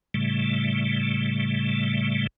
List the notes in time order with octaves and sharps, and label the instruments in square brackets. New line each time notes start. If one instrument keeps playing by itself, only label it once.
[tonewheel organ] A2 C#3 G3 A3